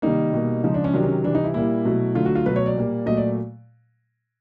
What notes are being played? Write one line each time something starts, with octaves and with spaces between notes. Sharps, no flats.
C3 D#3 G3 A#3 D#4
B2 G3 A#3
C#3 F3 G#3 D#4
D4
C#4
C3 D#3 F#3 D4
C#4
C3 E3 G3 D4
D#4
E4
A#2 G3 A#3 E4
B2 F#3 A3
D3 F#3 A3 F4
F#4
F4
B2 F#3 A3 B4
C#5
D5
A#2 G3 A#3
A#2 F#3 A3 D#5
D5